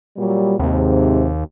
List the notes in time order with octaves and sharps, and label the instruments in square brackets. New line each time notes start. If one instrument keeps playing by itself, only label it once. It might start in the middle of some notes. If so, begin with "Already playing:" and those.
[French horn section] A#2 F#3 G3
[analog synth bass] D#2 [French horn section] G#2 C3